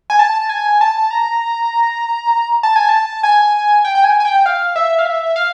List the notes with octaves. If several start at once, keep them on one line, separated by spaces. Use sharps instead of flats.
G#5
A5
G#5
A5
A#5
A5
G#5
A5
G#5
G5
G5
G#5
G#5
G5
F5
E5
F5
E5
F5